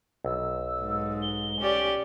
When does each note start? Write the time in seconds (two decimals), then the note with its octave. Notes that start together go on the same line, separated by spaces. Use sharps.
0.24 B1 E6
0.81 G#2
1.21 G7
1.60 C#4 G4 D5